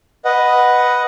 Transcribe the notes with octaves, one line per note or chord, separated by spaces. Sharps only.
B4 D#5 F#5